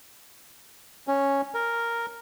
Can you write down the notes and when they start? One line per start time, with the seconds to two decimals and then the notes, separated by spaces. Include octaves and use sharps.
1.08 C#4
1.55 A#4